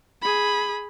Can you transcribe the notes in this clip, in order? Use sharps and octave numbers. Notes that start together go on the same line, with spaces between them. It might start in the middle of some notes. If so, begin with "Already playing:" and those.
G#4 B5